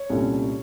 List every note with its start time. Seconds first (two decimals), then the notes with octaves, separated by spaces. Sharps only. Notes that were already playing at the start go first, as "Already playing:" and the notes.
Already playing: C#5
0.10 C2 A#2 A3 C#4